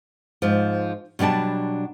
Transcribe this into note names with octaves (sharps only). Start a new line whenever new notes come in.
G#2 F3
B2 F#3 G3 D4 A5